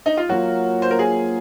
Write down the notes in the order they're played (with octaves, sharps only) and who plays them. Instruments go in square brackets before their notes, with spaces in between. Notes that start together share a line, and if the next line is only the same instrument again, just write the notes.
[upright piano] D#4
F4
[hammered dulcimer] F#3 A#3 F4 [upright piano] F#4
[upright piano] C5
A#4
G#4